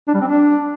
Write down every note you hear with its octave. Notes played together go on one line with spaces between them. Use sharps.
D4
G3
C4
D4